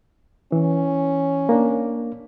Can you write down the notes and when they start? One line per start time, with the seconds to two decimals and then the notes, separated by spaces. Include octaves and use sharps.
0.52 E3 C#4
1.49 A#3 D4